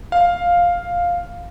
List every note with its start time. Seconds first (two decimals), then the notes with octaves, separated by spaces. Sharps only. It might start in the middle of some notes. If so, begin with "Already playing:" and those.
0.12 F5